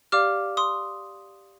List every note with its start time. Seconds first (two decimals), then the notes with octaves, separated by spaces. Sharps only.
0.12 G4 D5 F5 D6 F6
0.57 C6 D#6